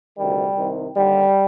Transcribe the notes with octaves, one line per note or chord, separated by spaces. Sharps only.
D2 C3 D#3 G3
C2 C3 D#3
D#2 D3 G3